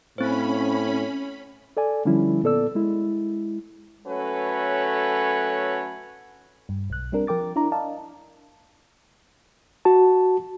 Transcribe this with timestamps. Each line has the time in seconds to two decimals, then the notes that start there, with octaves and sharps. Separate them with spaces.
0.18 A2 C4 C#4 C5 B5
1.77 A4 D5 G#5
2.05 D3 F3 G3 C#4 E4
2.43 A#2 B3 A4 D5 E6
2.75 G#3 E4
4.07 F#3 A3 C#4 A4 B4 C#5
6.69 G2
6.90 B1 F#6
7.12 G3 C4 D4 A#4
7.27 F3 A#4 G5 D6 A6
7.56 D4 E4 D5 A#5
7.72 D5 D#5 F5 A5
9.85 F#4 A5